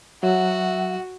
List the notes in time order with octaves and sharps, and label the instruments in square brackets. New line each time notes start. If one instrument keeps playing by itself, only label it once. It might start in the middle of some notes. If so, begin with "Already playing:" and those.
[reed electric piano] F#3 [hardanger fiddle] F#4 [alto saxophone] E5 [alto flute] F#5